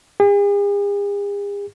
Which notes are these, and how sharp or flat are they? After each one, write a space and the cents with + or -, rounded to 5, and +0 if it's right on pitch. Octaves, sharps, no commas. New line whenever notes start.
G#4 -45